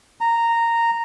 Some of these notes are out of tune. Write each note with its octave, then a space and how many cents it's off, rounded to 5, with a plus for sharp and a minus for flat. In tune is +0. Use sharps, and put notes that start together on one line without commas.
A#5 -10